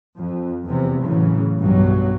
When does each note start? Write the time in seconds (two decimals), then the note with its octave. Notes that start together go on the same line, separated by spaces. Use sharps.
0.18 F2
0.65 E2 C3
1.04 A2 C#3 E3 F#3
1.58 B1 G2 B2 F#3